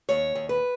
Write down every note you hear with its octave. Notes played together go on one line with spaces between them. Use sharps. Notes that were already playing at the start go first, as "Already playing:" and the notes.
D#2 C#5
D#2
B4